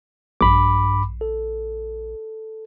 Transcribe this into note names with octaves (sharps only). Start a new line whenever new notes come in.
A#1 G2 B5 D6
A4